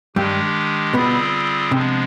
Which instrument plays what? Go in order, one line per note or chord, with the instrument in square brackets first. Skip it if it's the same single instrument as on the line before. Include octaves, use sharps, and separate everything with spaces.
[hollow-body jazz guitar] G2 G3 [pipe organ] D#3 G#3 D4 G4
[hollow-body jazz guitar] B2 B3 [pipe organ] D3 G3 C4 F4 G#4
[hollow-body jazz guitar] C3 [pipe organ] F3 G#3 B3 D4